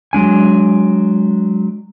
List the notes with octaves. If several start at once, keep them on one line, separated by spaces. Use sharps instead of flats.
F#3 G#3 D4 G#5